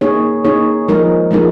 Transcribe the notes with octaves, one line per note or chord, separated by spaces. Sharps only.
A#3 D#4 G#4 C#5
A#3 D#4 G#4 C#5
F3 G#3 D#4 A#4
F3 G#3 D#4 A#4